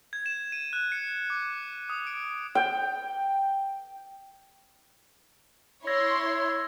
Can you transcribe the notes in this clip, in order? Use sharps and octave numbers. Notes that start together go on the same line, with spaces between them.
G#6
E7
D#7
F#6
C#7
D6
D#6
D7
G5
E4 C#5 C6 E6 G#6 A#6